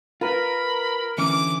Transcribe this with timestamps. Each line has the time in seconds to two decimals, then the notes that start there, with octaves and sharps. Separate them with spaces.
0.21 F4 A#4 B4 B5
1.18 D3 E3 C#4 D6